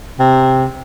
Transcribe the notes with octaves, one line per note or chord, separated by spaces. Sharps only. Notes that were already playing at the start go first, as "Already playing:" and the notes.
C3